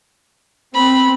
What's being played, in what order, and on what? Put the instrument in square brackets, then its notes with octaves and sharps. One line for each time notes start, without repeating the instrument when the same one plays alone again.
[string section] C4 [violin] B5